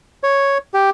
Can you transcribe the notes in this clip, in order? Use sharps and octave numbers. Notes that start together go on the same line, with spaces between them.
C#5
G4